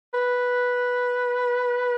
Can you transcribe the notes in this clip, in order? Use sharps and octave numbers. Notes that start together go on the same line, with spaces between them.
B4